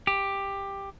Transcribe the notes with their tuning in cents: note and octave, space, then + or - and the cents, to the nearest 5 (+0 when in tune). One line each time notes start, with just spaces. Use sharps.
G4 +10